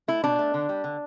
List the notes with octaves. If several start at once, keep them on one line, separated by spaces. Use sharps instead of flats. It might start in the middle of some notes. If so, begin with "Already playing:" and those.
A3 E4
B2 D4
A3
D3
G3
D3